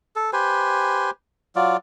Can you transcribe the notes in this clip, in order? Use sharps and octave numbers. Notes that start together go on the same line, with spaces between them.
A4
G4 B4 C5 G#5
F#3 F4 D5